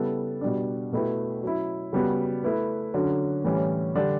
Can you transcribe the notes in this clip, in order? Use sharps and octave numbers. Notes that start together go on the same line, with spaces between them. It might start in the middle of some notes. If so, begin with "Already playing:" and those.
Already playing: C#3 G3 B3 E4 A4
B2 G3 D4
B2 A3 E4 G4 B4
F#3 C#4 E4
C#3 G3 B3 F#4
A3 E4 B4
D3 F#3 C#4
A2 E3 G3 C#4
D3 G3 D4